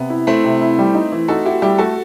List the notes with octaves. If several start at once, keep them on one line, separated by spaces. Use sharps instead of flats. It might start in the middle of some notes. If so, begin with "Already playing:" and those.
Already playing: C3 B3
E4
A3 C4 E4
C3
E4
G3
D#4
E3
D#4 F#4 A4
E4 F#4 G4
G3 E4 G4
A3 F#4 A4